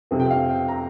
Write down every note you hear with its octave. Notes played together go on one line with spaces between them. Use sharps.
F2 C3 F3 C4
G5
F5
G5
A#5